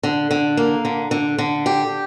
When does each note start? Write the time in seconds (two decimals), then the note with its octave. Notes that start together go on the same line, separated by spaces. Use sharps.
0.03 D3
0.31 D3
0.57 A#3
0.85 D3
1.11 D3
1.38 D3
1.66 G4